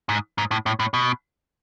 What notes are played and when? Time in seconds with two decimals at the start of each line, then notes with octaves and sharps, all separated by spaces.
0.09 G#2
0.38 G#2
0.51 A2
0.66 A2
0.80 A2
0.94 B2